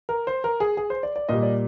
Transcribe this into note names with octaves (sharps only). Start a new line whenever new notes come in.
A#4
C5
A#4
G#4
G#4
C5
D5
D5
A#2 G3 D#5
D5